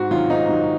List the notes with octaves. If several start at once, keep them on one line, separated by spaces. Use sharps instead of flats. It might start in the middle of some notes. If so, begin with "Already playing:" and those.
Already playing: G#2 F#4
D#3 F#3 F4
G#2 D#4
D#3 F#3